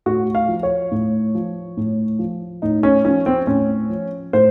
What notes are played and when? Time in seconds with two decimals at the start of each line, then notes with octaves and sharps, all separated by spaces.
0.06 A2 F#4
0.35 F5
0.48 F3
0.63 C#5
0.91 A2
1.35 F3
1.77 A2
2.19 F3
2.62 A2 D#4
2.83 C#4
3.04 F3 C#4
3.26 C4
3.47 A2 C#4
3.89 F3
4.33 A2 C5